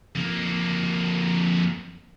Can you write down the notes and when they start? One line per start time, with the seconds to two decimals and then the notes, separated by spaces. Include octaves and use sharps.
0.15 F2 A#3